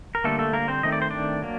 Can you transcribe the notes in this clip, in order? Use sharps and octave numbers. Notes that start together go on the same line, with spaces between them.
A#4
D3 G3 A3 A#3 A4
A3 A4
A#3 A#4
C4 C5
D#3 A3 C4 D#5
D5
C5
D4 D5
F#3 A#3